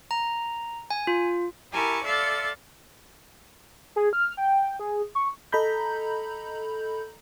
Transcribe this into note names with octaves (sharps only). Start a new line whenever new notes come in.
A#5
G#5
F4
E4 G4 A#4 G#5 A5 C#6
A4 D5 E5 F5 C6 A6
G#4
F6
G5
G#4
C#6
A4 D#5 A#5 B5 G6